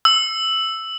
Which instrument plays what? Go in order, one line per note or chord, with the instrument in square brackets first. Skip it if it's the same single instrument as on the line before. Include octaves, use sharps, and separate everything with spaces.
[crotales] E6